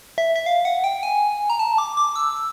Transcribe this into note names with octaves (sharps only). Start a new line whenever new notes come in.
E5
E5
F5
F#5
G5
G#5
A#5
A5
D6
D6
E6